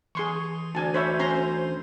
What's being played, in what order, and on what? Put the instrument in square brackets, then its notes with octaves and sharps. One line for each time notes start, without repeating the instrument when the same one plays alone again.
[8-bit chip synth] E3 [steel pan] G#4 C6 C#6
[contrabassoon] D2 [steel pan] D4 G#5 A5
[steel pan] C5 C#5 E5 [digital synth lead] B5
[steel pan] C#4 A#5 C6 [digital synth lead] C5